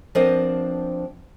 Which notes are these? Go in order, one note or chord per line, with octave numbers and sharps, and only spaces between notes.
F3 B3 C4 D4 A#4 D#5